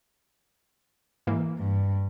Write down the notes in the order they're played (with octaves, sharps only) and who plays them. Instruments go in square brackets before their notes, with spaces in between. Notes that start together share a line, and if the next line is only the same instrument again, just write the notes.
[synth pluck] G#2 E3 A#3
[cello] G2